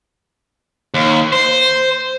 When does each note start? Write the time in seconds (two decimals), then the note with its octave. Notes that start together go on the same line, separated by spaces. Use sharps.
0.94 D#2
1.32 C5